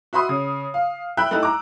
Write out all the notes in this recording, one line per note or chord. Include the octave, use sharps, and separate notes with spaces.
F#4 E5 B5 C6 D#6
C#3
F5
E5 G5 B5 E6 F#6
A3 D#4 E4 G4
A#5 D6